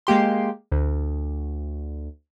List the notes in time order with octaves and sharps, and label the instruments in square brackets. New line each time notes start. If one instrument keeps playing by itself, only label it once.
[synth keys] G#3 A#3 G4 C6
D2